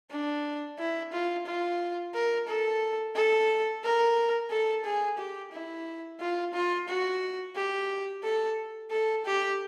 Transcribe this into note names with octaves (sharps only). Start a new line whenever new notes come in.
D4
E4
F4
F4
A#4
A4
A4
A#4
A4
G#4
G4
E4
F4
F4
F#4
G4
A4
A4
G4